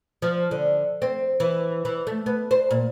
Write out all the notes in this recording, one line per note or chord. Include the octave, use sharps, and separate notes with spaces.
F3
D3
C4
E3
E3
A3
B3
C5
A#2